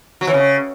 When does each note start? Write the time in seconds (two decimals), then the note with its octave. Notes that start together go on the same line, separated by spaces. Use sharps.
0.21 F#3
0.27 E3
0.34 C#3